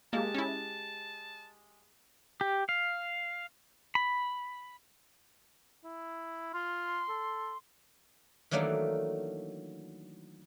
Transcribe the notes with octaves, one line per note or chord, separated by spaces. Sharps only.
G#3 A#3 G4 A5
C#4 E4
G4
F5
B5
E4
F4 C6
A4
D#3 E3 F#3 A3 A#3 D4